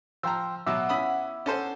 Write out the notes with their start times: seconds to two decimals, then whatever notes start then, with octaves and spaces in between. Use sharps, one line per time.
0.23 F3 G5 A#5 C6 E6
0.67 B2 F#3 E5 F#5 D6 E6
0.89 B3 C#4 E4 B5 D#6
1.46 C#4 D4 A4 C5